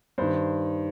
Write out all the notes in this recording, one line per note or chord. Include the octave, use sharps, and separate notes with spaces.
G2 D#3 C5